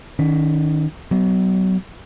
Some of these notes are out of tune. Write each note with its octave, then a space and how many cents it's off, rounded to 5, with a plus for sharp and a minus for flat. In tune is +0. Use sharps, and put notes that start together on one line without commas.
D#3 +0 C#4 +35
F#3 +30 B3 +25